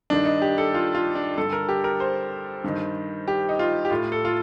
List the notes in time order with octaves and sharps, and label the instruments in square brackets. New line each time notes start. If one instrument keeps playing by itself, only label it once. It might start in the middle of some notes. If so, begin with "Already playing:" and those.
[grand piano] G2 D#3 D4
D#4
G4
A4
F4
F4
D4
G2 D3 A4
A#4
G4
A#4
C5
G2 D#3
G4
D#4
F4
G4
A2 F4
A4
F4